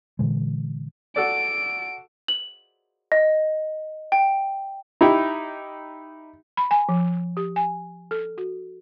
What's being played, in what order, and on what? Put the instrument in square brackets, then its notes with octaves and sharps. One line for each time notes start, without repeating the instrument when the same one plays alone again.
[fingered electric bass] A#2 D3 E3 G#3
[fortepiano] F#4 A4 D5 [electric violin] D7
[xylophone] F#7
D#5
G5
[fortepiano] D#4 E4 G4
[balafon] B5
G#5
F3
G4
G#5
A4
F#4